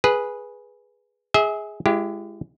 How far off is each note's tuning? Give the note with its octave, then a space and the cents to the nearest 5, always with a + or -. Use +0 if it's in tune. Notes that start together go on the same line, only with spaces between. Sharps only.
G#4 +0 B4 -10
G#4 +0 E5 -35
G#3 +0 E4 +45 G4 -5